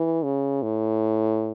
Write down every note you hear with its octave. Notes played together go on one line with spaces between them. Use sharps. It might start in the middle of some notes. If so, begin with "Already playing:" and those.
Already playing: E3
C#3
A2